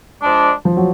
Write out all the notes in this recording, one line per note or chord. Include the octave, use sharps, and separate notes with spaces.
F3 G#3 D4
F3
F#3